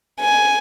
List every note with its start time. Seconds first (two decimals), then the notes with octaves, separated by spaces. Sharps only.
0.20 G#5